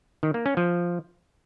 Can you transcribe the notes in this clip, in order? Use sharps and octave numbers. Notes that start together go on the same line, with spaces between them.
D#3
A#3
C#4
F3